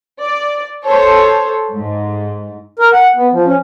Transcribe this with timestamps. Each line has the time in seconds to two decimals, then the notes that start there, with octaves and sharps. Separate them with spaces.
0.21 D5
0.86 A4 C5 C#5
1.75 G#2
2.79 A#4
2.93 F#5
3.16 B3
3.32 F3
3.46 C#4